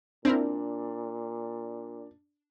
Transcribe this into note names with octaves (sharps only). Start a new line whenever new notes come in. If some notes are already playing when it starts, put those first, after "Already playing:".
A#2 C4 D4 E4 A#4